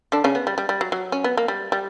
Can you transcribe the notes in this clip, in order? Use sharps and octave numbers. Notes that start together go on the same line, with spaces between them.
D3 D4
C#3 C#4
B3
G3
G3
G3
F#3
F#3
C#4
B3
A#3
G3
G3